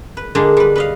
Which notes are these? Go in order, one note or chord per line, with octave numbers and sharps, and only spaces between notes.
B4
D3 G#3 A#3 D4
G3 B4
B4 D#5 F5